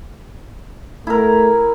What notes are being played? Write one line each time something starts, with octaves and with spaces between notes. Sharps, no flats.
A3 E4 A#4